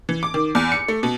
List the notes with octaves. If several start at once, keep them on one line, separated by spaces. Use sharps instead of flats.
E3
D6
D#3
E2
C#7
A3
B2